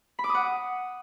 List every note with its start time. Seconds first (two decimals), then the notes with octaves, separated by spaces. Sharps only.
0.19 B5
0.24 D6
0.29 D#6
0.34 F#5